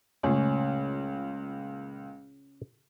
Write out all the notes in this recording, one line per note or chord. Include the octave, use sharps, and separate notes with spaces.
C#2 A#2 C#3 A3 C#4